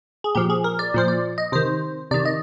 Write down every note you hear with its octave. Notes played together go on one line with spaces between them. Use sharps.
G#4
A#2 F3 G4
G#4
A#4
D5
A#2 F3 C5
D5
D#5
C3 D#3 C5
C3 D#3 D5
D#5